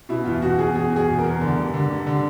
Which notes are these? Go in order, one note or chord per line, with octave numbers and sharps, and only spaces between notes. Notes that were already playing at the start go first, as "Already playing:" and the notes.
B2 E4
E2 F4
B2 F#4
E2 G#4
B2 G#4
E2 G#4
B2
A#4
E2
D3
G2
D3
G2
D3